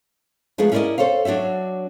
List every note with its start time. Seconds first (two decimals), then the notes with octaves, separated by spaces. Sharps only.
0.58 F3 G#3 A3 D#4 G#4 B4
0.72 C#4 E4 A#4 C5 D5 D#5
0.98 A4 C5 C#5 F5
1.25 F#3 D4 F#4 C#5 E5